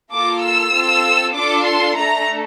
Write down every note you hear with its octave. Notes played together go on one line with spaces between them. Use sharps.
A#3 F4 A4 D6
E6
C4 F4 A4
D4 F4 A4 D6
C6
A3 D4 A4 A#5